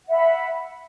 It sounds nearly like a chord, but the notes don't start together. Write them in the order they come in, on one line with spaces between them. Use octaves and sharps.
F#5 E5 B5